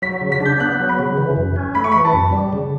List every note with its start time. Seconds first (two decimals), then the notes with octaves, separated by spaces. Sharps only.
0.02 F#3 B6
0.21 C#3
0.32 B6
0.40 D4
0.45 G6
0.60 B3 F#6
0.80 F#3
0.89 B5
0.99 C#3
1.17 E3
1.36 F#2
1.56 C#4
1.75 A3 B5
1.84 C#6
1.92 E3 B5
2.05 A5
2.13 F#2
2.32 G3
2.53 C#3